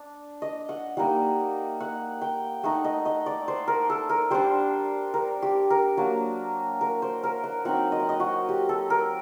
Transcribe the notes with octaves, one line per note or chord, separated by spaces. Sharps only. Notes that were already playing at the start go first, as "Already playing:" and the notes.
Already playing: D4
D#5
F#5
G3 A#3 D#4 F#5
F#5
G5
A3 D#4 F#5
D#5
D#5
D5
C5
A#4
A4
A#4
G3 D4 C5
A#4
G4
A#4
F#3 A#3 D4
A#4
C5
A#4
F#5
F#3 C4 D#4 F#5
D#5
F#5
D#5
F#4
G4
A4
A#4